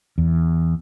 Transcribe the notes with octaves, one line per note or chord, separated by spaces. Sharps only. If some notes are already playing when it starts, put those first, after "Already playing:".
E2